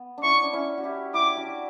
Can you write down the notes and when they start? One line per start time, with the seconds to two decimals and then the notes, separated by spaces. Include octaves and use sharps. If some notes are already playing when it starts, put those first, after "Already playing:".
Already playing: B3
0.18 D4
0.23 C#4 E4 C#6
0.43 D4
0.53 C#4 E4
0.78 F#4
0.84 E4 G4
1.14 E4 G4 D6
1.37 D4 F#4